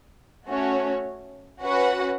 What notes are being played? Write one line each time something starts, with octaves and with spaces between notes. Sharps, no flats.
A3 C#4 F#4 C#5
C#4 F#4 B4 F#5